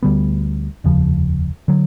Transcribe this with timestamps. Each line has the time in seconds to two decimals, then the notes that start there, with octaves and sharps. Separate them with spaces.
0.03 D2 D3 G3 B3
0.84 F1 D#2 C#3 F3
1.68 D3 F#3